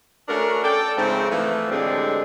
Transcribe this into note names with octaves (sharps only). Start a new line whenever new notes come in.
A3 C#4 D4 F#4 A#4
A4 D5 G5
G#2 C#3 F3 A3 C4
E3 F3 A3
A2 D3 G3 G#3 C4 D4